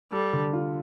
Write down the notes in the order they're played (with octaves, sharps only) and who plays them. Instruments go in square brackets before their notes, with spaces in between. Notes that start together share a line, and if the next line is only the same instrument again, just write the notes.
[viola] G3 [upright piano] A4
[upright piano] D3
F4